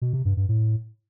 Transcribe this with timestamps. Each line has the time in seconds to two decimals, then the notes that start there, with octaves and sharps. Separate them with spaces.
0.02 B2
0.13 C3
0.25 G2
0.37 G2
0.49 A2